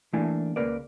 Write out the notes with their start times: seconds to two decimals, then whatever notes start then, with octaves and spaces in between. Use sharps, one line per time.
0.13 E3 A3 A#3 D4 E4 G#5
0.56 C#2 A#3 A#4 B4 D5